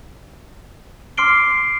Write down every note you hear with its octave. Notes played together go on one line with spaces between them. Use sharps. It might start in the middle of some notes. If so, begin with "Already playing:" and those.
C6 D6 F6 C7 D7 G7